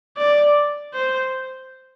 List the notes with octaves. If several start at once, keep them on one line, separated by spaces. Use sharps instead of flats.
D5
C5